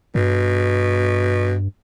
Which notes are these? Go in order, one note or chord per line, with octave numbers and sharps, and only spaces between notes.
G2 B2